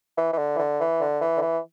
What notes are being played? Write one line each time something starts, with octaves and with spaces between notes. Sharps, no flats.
E3
E3
D3
E3
D3
E3
D3
E3
D3
E3